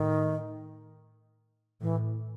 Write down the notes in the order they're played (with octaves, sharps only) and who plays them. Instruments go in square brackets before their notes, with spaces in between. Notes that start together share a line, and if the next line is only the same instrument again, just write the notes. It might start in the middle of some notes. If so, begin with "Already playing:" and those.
Already playing: [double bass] A2 [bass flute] D#3
[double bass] A2 [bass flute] E3